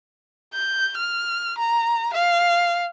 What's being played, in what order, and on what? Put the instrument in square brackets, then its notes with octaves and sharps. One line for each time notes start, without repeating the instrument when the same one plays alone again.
[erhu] G6
F6
A#5
F5